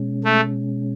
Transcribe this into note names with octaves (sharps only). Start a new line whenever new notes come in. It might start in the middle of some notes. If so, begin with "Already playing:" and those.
Already playing: B2 G#3 C#4
A3